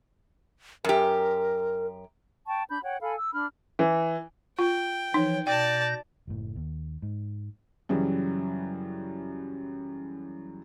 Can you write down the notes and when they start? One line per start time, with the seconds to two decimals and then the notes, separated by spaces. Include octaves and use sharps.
0.85 F#2 G4 A#4
2.47 G5 A5 C#6
2.70 D4 B5 G6
2.84 C#5 F#5 G5
3.01 A4 F5 G#5 B5
3.16 E6
3.33 D4 B5 F6
3.79 E3
4.59 F4 G5
5.14 E3 F3 D#4 C#5
5.47 B2 D5 G5 A5 G6 A#6
6.27 F#1 A2
6.56 D#2
7.02 G#2
7.89 F#2 C#3 E3 F#3 G3